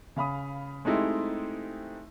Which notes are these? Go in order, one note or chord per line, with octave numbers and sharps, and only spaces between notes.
C#3 F5 B5 D#6
G#3 A3 C4 D#4 E4 G4